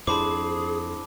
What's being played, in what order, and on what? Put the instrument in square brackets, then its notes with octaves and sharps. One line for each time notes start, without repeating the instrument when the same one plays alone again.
[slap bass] F2 [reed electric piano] D4 E4 C5 [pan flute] G#4 [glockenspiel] A5 B5 D6